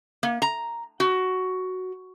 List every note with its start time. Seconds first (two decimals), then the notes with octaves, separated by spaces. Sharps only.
0.23 A#3
0.42 A#5
1.00 F#4